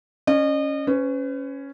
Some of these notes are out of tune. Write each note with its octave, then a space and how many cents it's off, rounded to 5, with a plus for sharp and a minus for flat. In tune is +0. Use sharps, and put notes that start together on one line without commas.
C#4 +0 D#5 -35
C#4 +0 B4 +40